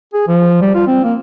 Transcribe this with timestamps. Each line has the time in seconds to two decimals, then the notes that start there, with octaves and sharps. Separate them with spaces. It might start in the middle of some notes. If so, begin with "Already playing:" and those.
0.14 G#4
0.28 F3
0.61 G3
0.75 F4
0.87 C4
1.04 A#3